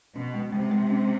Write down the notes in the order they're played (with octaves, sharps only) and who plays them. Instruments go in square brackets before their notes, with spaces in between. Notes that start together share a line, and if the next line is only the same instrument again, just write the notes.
[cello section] B2 [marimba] C#4
[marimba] G#3
[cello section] C3 [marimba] G#3
[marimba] G#3
C#4